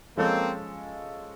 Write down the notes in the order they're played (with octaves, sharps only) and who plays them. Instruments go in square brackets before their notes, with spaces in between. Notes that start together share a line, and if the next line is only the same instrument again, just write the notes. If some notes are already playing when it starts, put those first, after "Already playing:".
[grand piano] F3 G#3 C#4 F4 A4 [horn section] A#3 C4